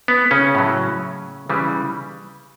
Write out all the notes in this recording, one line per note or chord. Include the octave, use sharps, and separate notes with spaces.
B3
C#3 C#4
A2 F#3
C#3 E3 G3